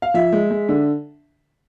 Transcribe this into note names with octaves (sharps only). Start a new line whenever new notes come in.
F5
F3 E5
G#3
G#3
D3